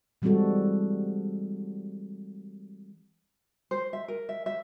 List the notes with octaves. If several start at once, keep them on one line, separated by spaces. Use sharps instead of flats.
E3 G3 G#3 C4 F#4 A4
C5
E5
A#4
E5
E5